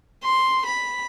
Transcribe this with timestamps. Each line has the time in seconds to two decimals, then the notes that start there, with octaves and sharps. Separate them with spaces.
0.24 C6
0.65 B5